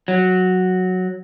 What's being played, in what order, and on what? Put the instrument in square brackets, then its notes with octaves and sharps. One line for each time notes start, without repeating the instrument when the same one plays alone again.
[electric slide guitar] F#3